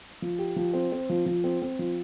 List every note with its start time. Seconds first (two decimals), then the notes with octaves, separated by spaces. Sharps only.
0.22 F3
0.38 G4
0.56 F3
0.73 C4
0.92 C4
1.09 F3
1.26 F3
1.44 C4
1.62 C4
1.79 F3